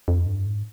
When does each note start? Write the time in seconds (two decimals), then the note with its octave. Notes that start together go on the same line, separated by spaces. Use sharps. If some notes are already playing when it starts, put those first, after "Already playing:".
0.08 F2
0.26 G2
0.46 G#2